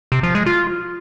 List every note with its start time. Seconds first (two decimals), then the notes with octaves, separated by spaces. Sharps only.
0.12 C3
0.23 F3
0.35 G#3
0.46 F4